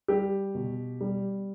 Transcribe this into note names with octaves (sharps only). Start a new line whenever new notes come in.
G3 G4
B2
G3